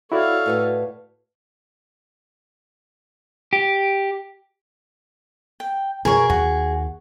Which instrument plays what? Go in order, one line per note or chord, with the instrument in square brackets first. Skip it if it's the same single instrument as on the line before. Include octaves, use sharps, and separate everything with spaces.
[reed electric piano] E4 F#4 D5 [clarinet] A4 [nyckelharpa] C#5 F5
[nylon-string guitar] A2 B4 F#5
[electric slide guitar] G4
[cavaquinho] G5
[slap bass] B2 [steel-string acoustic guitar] G#4 [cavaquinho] A#4 C#5
[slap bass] D#2 [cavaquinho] F#4